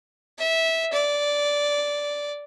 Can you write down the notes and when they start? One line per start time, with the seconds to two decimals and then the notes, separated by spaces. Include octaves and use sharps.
0.38 E5
0.93 D5